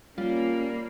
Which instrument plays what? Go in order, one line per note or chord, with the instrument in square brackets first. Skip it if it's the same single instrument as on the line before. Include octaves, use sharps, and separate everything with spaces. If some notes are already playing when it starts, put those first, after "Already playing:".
[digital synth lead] G3 [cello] A#3 [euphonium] C#4 [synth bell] F4